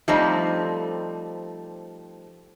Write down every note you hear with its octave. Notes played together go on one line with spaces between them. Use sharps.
F3 G3 A3 C4 D#4